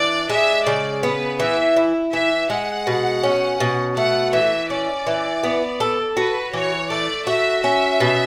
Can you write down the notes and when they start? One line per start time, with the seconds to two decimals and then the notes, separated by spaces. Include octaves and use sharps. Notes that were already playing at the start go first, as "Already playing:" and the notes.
Already playing: E3 D4 D5
0.29 G#3 E5
0.66 C#3 D5
1.03 B3 B4
1.40 E3 E5
1.76 E4
2.13 E3 E5
2.50 G#3 F#5
2.87 B2
3.23 C#4
3.60 B2
3.97 A3 F#5
4.33 E3 E5
4.70 C#4 D5
5.07 E3
5.43 B3
5.80 A4
6.17 F#4 B4
6.53 E3 C#5
6.90 A3 D5
7.27 F#4 E5
7.63 C#4 E5
8.00 B2